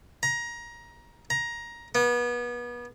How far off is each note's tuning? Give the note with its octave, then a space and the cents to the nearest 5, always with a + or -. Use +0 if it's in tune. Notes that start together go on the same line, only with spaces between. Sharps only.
A#5 +20
A#5 +15
B3 -30